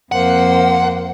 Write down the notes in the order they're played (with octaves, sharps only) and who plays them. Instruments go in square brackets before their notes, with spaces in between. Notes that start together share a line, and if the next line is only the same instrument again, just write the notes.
[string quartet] F2 A#3 C5 [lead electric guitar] F#5